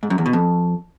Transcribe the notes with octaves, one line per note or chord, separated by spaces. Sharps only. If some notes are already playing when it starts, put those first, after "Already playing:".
G#2
F#2
E2
B2
F2